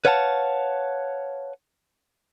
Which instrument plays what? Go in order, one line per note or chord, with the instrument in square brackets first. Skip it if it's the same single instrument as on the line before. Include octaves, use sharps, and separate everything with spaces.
[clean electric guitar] B4 C#5 F5 F#5 G#5 A5